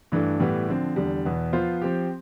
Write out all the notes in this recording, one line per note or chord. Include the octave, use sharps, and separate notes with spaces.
G2 E3 A3 D4
A2 E3 G3 B3
D3 F3 C4
E2 D3 G3
E2 B2 B3
F3 B3 F4 C5
F3 C4 G4